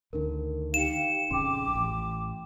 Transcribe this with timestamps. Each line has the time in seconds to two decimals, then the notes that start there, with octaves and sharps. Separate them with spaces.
0.13 D2 D3 D#3 A#4
0.74 D#4 G4 F5 G5 C#7 E7
1.31 A#1 F2 C#3 G5 C6 D6
1.75 A1